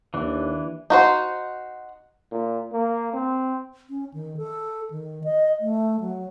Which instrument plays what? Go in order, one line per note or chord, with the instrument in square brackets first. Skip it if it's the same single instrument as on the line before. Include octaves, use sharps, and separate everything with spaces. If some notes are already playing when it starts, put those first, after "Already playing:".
[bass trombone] D#2 [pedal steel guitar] E3 D4
[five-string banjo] D#4 F#4 C5
[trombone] A#2
A#3
C4
[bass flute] C#4
D#3
A4
D#3
D#5
A3
F#3